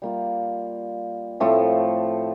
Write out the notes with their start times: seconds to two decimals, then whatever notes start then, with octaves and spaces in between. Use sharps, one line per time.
0.02 G3 A#3 F4
1.40 A2 F3 A3 C4